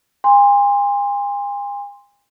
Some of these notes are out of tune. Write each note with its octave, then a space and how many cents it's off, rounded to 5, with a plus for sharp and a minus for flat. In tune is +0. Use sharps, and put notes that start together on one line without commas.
G#5 -40 C6 +0